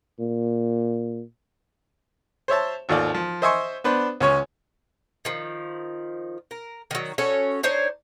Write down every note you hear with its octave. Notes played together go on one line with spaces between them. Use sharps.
A#2
C5 C#5 E5 A5
G#1 D#2 F4 A4 D5
F3
C5 D#5 E5 G#5 C6 C#6
B3 D4 B4 C5
C#2 C#4 C#5 C#6
D#3 F3
A#4
D#3 F#3
C#4 F#4 A4 C#5
D4 D#4 C5 C#5